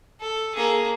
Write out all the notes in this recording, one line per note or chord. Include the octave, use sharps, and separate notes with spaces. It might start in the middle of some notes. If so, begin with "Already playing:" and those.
A4
A#3 G#4